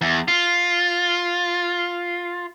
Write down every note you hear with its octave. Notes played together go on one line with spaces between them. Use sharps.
E2
F4